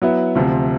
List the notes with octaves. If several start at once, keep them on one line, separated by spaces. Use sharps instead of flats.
F#3 B3 E4
D2 C3 F3